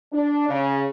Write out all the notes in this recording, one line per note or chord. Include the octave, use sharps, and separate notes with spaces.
D4
C#3